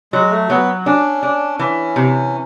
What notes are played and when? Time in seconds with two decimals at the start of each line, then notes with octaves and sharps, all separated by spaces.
0.13 F#3 G#3
0.31 A3
0.50 F#3 B3
0.86 C#4 D4
1.23 D4
1.59 E3 C#4
1.96 C3